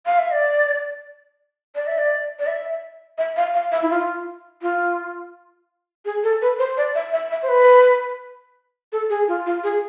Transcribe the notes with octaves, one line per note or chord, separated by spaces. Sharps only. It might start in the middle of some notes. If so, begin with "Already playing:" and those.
F5
E5
D5
D5
E5
D5
D5
E5
E5
F5
F5
E5
E4
F4
F4
G#4
A4
B4
C5
D5
E5
E5
E5
C5
B4
A4
G#4
F4
F4
G#4